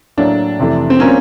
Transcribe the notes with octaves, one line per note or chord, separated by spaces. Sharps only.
A2 F#3 A#3 D4
F2 C3 E3 A3
C4
F#3 A#3 C#4 D4 F4 A#4